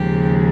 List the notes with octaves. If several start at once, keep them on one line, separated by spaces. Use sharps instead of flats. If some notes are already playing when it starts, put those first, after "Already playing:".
Already playing: D#2 C#3 F3 G#3 G4